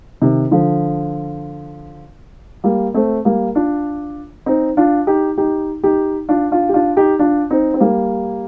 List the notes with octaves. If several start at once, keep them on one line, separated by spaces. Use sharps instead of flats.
C3 D#3
D3 F3
G3 A#3
A3 C4
G3 A#3
D4 F4
C4 D#4
D4 F4
D#4 G4
D#4 G4
D#4 G4
D4 F4
D4 F4
G4
D4 F4
D#4 G4
D4 F4
C4 D#4
C4
G3 A#3